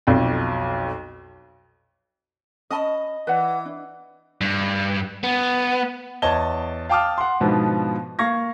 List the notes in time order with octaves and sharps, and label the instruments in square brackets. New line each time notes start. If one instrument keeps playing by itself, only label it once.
[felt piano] B1 F2
[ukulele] C#4 A5 B5 [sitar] D#5
[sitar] E3 [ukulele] B4 D5 F#5
[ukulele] D4
[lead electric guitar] G2
B3
[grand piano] E2 C#5 D#5 A5 G#6 G7
F5 G5 A5 D6 D#6 F6
F#5 C6
G#2 B2 D3 F3 B3
A#3 F5 C#6 G#6 A#6